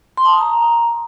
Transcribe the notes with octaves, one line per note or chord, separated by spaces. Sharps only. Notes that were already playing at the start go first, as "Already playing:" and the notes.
C6
A5
D#6
A#5